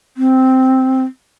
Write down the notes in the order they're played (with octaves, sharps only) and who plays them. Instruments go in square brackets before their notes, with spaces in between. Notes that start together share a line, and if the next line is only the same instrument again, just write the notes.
[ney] C4